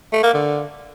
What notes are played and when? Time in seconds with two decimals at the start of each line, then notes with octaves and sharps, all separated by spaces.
0.13 A3
0.23 A#3
0.34 D3